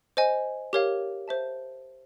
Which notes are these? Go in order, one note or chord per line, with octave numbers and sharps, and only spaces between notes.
C5 D#5 G#5
G4 A#4 C#5 F5
C5 E5 A5